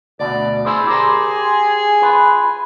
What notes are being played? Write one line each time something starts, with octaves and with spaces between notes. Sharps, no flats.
D2 B2 D5
E4 G#4 C5
G4 A#4 C5
F4 B4